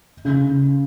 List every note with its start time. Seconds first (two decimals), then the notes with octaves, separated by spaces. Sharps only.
0.25 C#3